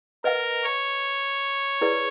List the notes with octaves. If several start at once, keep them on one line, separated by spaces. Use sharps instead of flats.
A#4 B4 D#5 F#5
C#5
E4 G#4 B4 D5